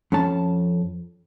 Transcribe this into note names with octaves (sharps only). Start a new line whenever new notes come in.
F2 C#4 A5